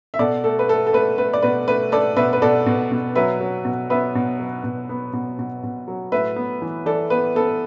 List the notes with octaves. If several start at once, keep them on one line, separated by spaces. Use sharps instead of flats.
E5
B2 A4 D5
A3 A4
B4
A3 A4
A4
A3 B4
A3 B4
D5
B2 B4
A3 B4
A3 A4 D5
B2 B4 E5
B4
B2 A4 D5
B2
B2
F#3 B4 E5
F#3
B2
B3 B4 E5
B2
F#3
B2
B3
B2
B2
B2
F#3
A2 B4 E5
B3
E3
E3 A4 D5
B3 B4
B3 A4